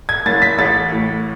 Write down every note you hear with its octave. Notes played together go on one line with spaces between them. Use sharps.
G#6
F#1 A6
B6
A1 A6
A2